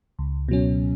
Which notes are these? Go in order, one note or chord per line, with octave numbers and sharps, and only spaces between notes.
C#2
B2 F#3 C#4